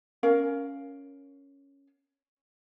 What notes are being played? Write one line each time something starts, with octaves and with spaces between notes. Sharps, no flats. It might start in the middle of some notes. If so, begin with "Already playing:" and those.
C#4 A#4 F5